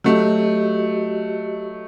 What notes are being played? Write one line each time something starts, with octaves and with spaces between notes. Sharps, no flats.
F#3 A3 F#4 G4 D#5